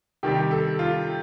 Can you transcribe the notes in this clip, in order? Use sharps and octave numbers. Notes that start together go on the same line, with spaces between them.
C3 D#3 G3 G4
A4
F4